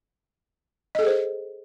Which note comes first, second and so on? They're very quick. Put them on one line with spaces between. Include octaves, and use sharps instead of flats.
D#5 A4 G#4 C5